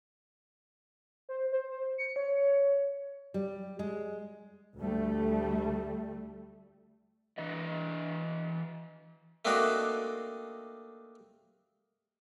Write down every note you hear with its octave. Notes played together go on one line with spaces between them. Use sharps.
C5
C5
C#7
C#5
G3
G#3
D2 G3 A3
E3 B4 D#5
A3 A#3 C4 D4 D#4 F#4